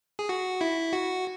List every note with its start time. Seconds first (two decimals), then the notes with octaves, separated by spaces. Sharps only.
0.19 G#4
0.29 F#4
0.61 E4
0.93 F#4